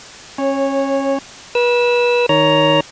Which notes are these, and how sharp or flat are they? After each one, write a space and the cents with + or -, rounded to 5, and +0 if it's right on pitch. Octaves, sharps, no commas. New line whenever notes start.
C#4 -30 C#5 -10
B4 -35 E6 +0
D#3 +0 C#5 +15 A#5 +5